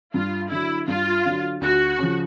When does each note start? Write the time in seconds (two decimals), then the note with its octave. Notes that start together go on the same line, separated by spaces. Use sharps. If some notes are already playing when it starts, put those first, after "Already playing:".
0.14 G2 F4
0.51 D3 F#3 E4
0.88 G2 F4
1.25 D3 F#3
1.61 D2 F#4
1.99 C#3 F3